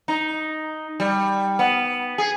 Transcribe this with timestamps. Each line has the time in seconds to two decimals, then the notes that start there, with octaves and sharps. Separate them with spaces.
0.08 D#4
1.00 G3
1.59 B3
2.18 G#4